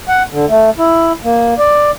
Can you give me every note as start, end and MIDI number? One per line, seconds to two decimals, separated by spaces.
0.08 0.22 78
0.31 0.46 50
0.49 0.70 57
0.78 1.12 64
1.24 1.54 58
1.58 1.91 74